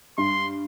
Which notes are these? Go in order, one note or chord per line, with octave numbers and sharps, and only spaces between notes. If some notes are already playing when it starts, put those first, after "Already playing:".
G2 C6